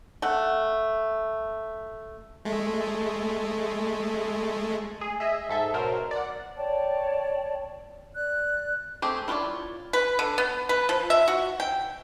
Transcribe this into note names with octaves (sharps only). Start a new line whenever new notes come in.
A3 F#5
G#3 A3
G#4
G#4 D#5 E5
G#2 A4 E5
B2 F#3 A#4 C5
D5 F#5
C#5 D5 G5 A5
D5 F#6
A3 C4 G4 G#4
E4 F4 B4 C#5 D5
B4
D3
B3
B4
F3
E5
F#4
G5